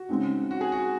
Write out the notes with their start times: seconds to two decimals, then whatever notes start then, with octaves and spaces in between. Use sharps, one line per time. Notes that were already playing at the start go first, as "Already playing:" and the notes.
Already playing: F#4
0.09 C#3 G#3 C4 D#4
0.51 F#4
0.61 G#4
0.72 F#4